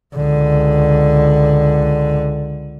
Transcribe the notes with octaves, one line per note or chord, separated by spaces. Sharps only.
C#2 D3